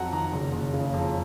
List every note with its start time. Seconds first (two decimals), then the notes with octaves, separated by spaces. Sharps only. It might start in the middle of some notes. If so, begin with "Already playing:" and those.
Already playing: F2 F#3 C4 F#5 A#5
0.12 D#3 A#5
0.33 F#1
0.52 F#1
0.73 C#3
0.93 F2